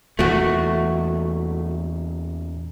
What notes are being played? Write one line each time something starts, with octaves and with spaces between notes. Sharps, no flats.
E2 A#2 E3 A3 F#4